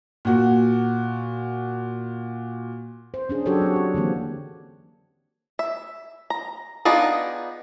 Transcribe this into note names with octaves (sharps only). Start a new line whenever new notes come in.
A#2 F#4
C5
C#4 D4 G#4
F#3 D4 F#4 G4 A4 C#5
C4 A4
F#4
D3 E3 A#3 C4
E5
A#5
B3 D4 D#4 F4 G#4